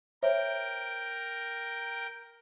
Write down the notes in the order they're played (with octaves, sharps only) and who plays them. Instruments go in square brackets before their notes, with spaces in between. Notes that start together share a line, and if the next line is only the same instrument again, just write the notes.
[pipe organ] A#4 G5 [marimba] C5 C#5 E5